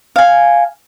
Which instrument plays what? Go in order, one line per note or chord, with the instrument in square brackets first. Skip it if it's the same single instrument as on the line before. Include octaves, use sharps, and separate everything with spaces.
[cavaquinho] F5 G#5